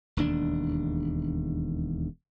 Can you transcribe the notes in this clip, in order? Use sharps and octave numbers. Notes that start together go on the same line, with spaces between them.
E1 D#2 D4